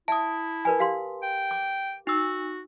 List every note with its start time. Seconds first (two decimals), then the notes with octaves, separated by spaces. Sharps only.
0.08 E4 E5 A5 D#6
0.65 A#4 B4 G#5
0.79 G4 F5 C6
1.23 G5
1.51 D6
2.07 D#4 F#4 E6